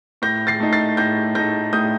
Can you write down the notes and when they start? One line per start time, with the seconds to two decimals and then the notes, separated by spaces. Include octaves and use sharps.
0.22 A2 G6 A#6
0.47 A6 C7
0.60 A3 D#4
0.73 A6 C7
0.97 A2 G6 A#6
1.35 A3 D#4 G6 A#6
1.73 A2 D#6 G6